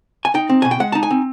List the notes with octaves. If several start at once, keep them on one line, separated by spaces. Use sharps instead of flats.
G#5
D#4 G5
C4
B2 G#5
G5
G#3 F#5
D#4 A5
G#5
C4